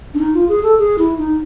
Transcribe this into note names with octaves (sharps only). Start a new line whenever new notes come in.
D4
D#4
F4
G#4
A4
G#4
E4
D#4